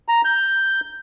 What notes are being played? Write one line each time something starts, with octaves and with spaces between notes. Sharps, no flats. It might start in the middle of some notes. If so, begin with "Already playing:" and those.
A#5
G6